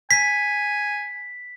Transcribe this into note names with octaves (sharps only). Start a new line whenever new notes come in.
G#5 B6